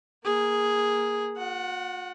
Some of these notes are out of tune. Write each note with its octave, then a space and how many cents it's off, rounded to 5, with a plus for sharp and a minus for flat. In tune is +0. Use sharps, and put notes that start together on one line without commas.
A#3 +0 G#4 +0
F#4 -45 F#5 +10